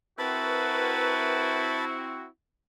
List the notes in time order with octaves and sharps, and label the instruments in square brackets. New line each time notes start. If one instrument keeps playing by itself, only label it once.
[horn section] C4 E4 F#4 [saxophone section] A#4 B4 [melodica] A5 B5